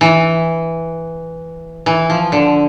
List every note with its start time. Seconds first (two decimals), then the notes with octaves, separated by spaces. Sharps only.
0.01 E3
1.86 E3
2.10 F3
2.32 D3